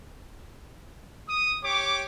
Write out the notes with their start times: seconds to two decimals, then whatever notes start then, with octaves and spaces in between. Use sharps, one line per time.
1.29 D#6
1.64 G4 C#5 D6